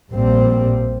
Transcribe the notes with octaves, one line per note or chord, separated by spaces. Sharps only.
A#1 A#2 G3 C4